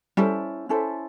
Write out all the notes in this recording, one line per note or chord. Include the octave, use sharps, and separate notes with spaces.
G3 C#4 E4 A4 C5
C#4 E4 A4 C5